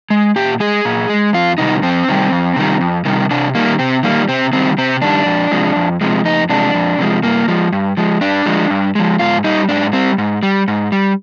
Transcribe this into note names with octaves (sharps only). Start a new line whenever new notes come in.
G#3
A#2 G4
G#3 G#4
A#2
G#3
F2 F4
C3 D#3 G3 D#4
F2 C4
C3 D#3 G3
F2
C3 D#3 G3
F2
C3 D#3 G3
C3 D4
D#3 G3 A#3
C3 C4
D#3 G3 A#3
C3 C4
D#3 G3 C4
C3 C4
D#3 G3 D4
F2
C3 F3 G#3
F2
C3 F3 G#3
F2 D#4
C3 F3 G#3 D4
F2
C3 F3 G#3
G2 A#3
F3 G#3
G2
F3 G#3
G2 D4
F3 G#3
G2
F3 G#3
G#2 F4
G3 D#4
G#2 D4
G3 C4
G#2
G3
G#2
G3